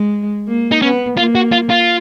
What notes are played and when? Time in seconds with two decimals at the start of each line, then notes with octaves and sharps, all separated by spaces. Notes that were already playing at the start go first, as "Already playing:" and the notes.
Already playing: G#3
0.48 A#3
0.72 D#4
0.82 B3 C#4
1.17 A#3 F4
1.35 F#4
1.52 F4
1.70 F4